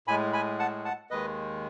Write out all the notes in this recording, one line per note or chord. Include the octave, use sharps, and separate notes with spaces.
A2 G#3 G#5 B5
G#5 B5
F#5 A5
F#5 A5
D#2 D#3 G#3 B4 D#5